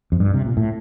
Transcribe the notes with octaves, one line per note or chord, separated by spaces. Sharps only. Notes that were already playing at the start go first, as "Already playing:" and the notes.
F2
G2
C3
A#2
A2